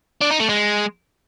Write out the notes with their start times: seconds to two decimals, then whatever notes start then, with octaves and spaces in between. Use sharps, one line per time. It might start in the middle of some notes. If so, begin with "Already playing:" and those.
0.21 D4
0.31 D#4
0.40 A3
0.49 G#3